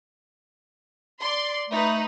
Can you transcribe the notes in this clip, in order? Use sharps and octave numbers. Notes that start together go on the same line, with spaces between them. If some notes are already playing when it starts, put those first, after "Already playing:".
D5 C6
A3 D#4 B4